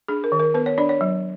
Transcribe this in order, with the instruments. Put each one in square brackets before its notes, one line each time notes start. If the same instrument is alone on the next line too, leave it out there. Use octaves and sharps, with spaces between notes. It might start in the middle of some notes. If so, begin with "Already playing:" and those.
[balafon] D4 G#4
A#4
D#3
A#4
B3 B4
C#5
D4 D5
C#5
F#3